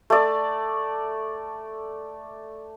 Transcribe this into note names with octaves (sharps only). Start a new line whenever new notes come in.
A3 D5